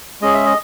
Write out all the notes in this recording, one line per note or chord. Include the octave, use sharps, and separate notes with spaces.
G#3 C#4 G#4 D#5
E5
D#5